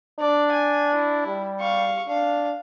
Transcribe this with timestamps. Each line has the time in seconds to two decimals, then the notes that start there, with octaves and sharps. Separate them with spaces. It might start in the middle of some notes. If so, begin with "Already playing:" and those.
0.20 D4 D5
0.52 G#5
0.95 E4
1.27 G3
1.60 F5 C#6
2.09 D4 F5